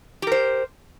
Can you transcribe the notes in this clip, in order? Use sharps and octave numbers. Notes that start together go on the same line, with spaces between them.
G4 A#4 C5